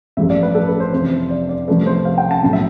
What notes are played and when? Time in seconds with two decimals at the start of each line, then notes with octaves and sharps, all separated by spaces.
0.17 A1 G2 F3 A3 E5
0.30 D5
0.43 B4
0.55 A4
0.68 B4
0.80 C5
0.92 F2 C3 E3 C5
1.30 D5
1.49 D5
1.68 C2 C3 F3 A3 B4
1.86 C5
2.05 F5
2.18 G5
2.31 A5
2.43 B1 A2 F3
2.53 E5